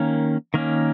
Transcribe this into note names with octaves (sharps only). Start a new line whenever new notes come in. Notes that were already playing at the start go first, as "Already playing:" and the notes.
Already playing: D#3 A#3 C#4
D#3 A#3 C#4